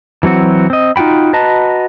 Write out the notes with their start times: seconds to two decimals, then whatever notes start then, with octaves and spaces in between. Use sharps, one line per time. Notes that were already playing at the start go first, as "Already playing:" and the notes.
0.23 E3 F#3 C4 F#4
0.70 C4 D#5
0.96 D#4 F4 F#4 G5 B5
1.33 F#4 B4 D#5 A5 A#5